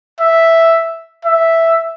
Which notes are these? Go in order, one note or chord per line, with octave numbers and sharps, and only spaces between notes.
E5
E5